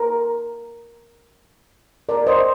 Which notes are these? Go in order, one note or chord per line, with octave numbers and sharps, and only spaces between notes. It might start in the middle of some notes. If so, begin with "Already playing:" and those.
Already playing: A#4
A#4 D5
C5 D#5